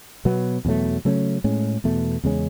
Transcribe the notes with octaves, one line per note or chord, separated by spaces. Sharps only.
B2 F#3 B3
E2 B2 F#3 A3
C#3 F#3 A3 C#4
A2 G#3 C#4
E2 B2 A3
E2 C#3 G#3 C#4